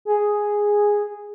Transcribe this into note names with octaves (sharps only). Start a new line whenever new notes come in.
G#4